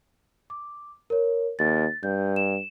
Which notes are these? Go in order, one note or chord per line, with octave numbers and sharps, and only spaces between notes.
D6
A#4 C#5
D#2 A6
G2 G6
E7